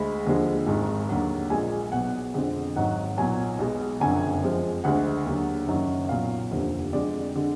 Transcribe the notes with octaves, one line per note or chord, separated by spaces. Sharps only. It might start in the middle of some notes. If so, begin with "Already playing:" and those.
Already playing: D2 G#3 B5
D#2 D3 F3 G#3
G#1 G#2 D#3 G#3
D#2 D3 F#3
A#1 A#2 G#3 G#5
B1 B2 F#3 F#5
F2 D3 F3 G#3
G#1 G#2 D#3 F#3 F#5
B1 A#2 F#3 G#5
B1 B2 G#3
F#1 F2 D3 F#3 G#5
F2 F3 G#3
D2 D3 G#3 F#5
D#2 D3 F#3
F#1 F#2 D#3 F#3
B1 A#2 F#3 F5
F1 D#2 D3 F3
F2 D3 G#3 D5
D3 G#3